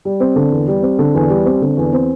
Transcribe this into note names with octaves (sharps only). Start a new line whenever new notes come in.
G3
C4
D3
E2
G3
C4
D3
E2
G3
C4
D3
E2
C4